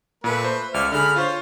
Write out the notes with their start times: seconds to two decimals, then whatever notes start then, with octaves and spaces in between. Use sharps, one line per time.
0.24 A#2 A3 B4
0.44 C5
0.74 C#2 D5 E5 F6
0.92 D3 G#4 B5 F6
1.16 F4 C5 C#5